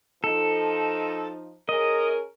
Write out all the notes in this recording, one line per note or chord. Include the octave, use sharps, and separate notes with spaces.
F3 D#4 A4
C#4 G#4 A#4 D#5